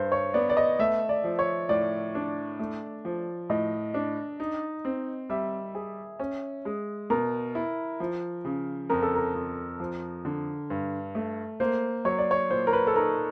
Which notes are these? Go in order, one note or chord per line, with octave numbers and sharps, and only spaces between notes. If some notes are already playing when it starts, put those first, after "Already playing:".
Already playing: G2 C5
C#5
B3 D5
D5
D#5
A3 E5
D5
F3
C#5
A2 D5
D4
A3
F3
A2 D#5
D4
D#4
C4
G3 E5
G#4
C#4
G#3
B2 A#4
E4
F3
C#3
F2 A#4
A4
A#4
F2
F3
D3
G2
A3
A#3 C5
F#3 C#5
D5
C#5
A#2 C5
A#4
B4
A4
D#4 A#4